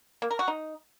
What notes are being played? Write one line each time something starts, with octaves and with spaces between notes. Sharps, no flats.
A#3
A#4
F#4
D#4